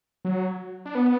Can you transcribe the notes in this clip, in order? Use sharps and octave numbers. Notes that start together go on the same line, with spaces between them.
F#3
D4
B3